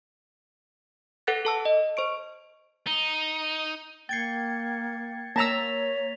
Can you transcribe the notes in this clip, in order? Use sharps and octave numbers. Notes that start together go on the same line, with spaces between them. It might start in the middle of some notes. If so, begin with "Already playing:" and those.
A4 B4 F#5 F#6 A6 A#6
A4 A5 E6
D#5
C5 C#6 D7
D#4
A#3 G5 G#6 A6 C7 C#7
A#3 C#5 A5 A#5 E6 A#6 B6 F7